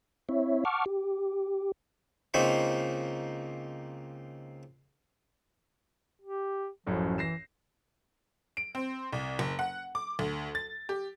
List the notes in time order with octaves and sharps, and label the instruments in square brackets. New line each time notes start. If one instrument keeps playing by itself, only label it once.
[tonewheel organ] C4 E4 C#5 E5
F#5 A5 C#6 D6 F6
G4
[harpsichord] C#2 A#3 C4 D#4 B5 C#6
[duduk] G4
[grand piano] A1 F#2 A2 [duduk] F3
[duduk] E3 [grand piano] A#6 C7 E7
[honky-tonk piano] D7
C4
C2
F#1
F#5
D6
D2
A6
G4